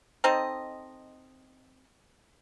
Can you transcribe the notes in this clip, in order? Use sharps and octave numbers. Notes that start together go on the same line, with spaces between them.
C4 D#4 A4 D#5